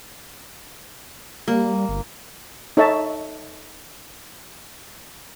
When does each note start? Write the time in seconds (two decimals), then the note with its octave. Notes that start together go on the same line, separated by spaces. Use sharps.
1.48 G3 A#3
1.89 G1
2.77 D#4 A4 C#5 D#5 E5 A5